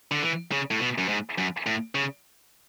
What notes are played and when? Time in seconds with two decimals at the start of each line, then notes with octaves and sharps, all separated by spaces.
0.11 D3
0.23 E3
0.51 C#3
0.71 A2
0.80 B2
0.98 F#2
1.08 G#2
1.38 F#2
1.66 A2
1.95 C#3